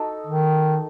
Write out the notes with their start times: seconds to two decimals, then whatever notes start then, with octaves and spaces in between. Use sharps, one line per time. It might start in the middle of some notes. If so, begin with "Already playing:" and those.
Already playing: D#4 F#4 A4
0.27 D#3